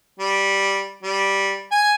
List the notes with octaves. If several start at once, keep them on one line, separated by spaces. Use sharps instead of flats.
G3
G3
G#5